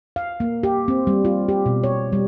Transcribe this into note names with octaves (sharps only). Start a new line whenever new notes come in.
F5
A#3
G4
C4
G3
F4
G4
B2
C#5
G3